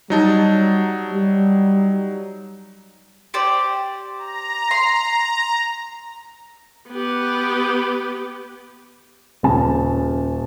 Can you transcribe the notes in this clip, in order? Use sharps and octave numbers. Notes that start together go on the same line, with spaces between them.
F#3 G3 D#4 A5
G3
G4 C5 D5
A#5
C6
B3 G4
D#1 C#3 A5